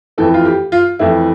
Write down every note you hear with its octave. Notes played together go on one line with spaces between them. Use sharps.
F2 E3 A3 A4
F4
G4
F4
F2 E3 A3 E4